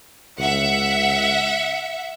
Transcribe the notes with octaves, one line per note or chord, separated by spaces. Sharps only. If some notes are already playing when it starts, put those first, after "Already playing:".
C#2 E5 F#5